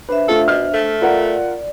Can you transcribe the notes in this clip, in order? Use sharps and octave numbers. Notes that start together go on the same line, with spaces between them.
D4 B4 C5 E5
A3 F4 A4
B2 F6
A3
F4 A#4 D5 F#5